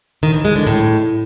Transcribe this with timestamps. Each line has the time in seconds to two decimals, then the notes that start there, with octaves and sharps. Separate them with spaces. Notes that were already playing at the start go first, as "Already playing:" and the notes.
0.23 D#3
0.34 E3
0.45 G#3
0.56 D3
0.67 A2